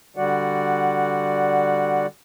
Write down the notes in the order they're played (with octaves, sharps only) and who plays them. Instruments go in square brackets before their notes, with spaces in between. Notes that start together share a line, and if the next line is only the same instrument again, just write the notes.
[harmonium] D3 G3 F#4 D5 F#5